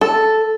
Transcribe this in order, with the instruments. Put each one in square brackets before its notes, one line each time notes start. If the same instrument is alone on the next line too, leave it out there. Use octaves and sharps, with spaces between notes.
[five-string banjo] A4